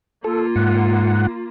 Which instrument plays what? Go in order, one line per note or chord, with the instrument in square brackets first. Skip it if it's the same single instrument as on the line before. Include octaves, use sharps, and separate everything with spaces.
[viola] A#3 F4 [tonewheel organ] A4
[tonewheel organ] G#2 F#5